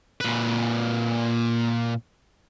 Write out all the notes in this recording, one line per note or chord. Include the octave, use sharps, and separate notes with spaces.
A#2 B4